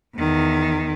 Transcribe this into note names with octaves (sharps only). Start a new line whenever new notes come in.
E2 D#3